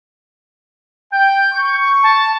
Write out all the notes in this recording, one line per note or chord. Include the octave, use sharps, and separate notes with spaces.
G5 G6
C#6
A5